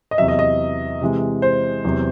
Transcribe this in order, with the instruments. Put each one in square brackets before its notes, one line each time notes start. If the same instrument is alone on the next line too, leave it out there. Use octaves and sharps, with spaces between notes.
[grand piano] D#5
E2 C3 F#3 E5
D#5
D#5
C3 E3 G#3
C5
E2 C3 F#3